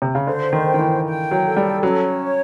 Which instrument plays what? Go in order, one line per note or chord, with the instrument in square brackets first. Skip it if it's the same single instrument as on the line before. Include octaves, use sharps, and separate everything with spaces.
[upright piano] C3
C#3
[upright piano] D3 [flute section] C5
[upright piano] D#3
[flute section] G5
[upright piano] D#3
E3
[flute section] G5
[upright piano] F#3
[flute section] A4
[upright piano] G3
[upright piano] F#3 [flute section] C#4
[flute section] C#5